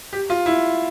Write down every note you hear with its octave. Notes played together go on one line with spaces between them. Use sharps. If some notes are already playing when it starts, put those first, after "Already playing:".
G4
F4
E4